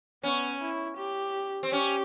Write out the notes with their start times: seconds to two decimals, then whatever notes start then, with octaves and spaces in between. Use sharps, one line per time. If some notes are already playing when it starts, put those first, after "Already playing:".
0.23 B3 C#4
0.60 E4
0.97 G4
1.63 C4
1.72 C#4 G4